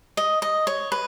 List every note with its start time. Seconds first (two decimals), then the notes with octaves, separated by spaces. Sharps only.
0.17 D#5
0.42 D#5
0.67 C#5
0.92 B4